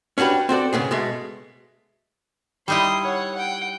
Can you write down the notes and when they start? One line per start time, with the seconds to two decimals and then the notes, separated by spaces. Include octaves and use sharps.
0.18 C#4 D4 F#4 G4 B4
0.49 C4 F#4 A4 D5
0.73 G#2 C#3 B3 G#4
0.91 B2 G#3 A3
2.68 G3 D#4 E4 C6 D#6
3.04 C#5 F#5
3.35 F#5 G5